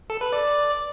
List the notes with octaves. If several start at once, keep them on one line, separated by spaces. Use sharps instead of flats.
A4
B4
D5